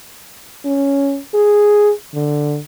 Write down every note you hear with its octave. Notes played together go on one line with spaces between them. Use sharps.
C#4
G#4
D3